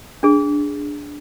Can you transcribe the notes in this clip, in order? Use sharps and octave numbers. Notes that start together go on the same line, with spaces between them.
D4 G#4